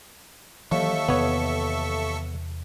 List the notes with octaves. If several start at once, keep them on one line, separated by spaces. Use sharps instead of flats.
D#2 E3 F#3 A4 E5 C#6
E2 C3 B3 C#5